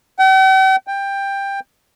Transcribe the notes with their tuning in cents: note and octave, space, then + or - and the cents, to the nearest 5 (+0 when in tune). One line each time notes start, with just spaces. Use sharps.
G5 -45
G5 +15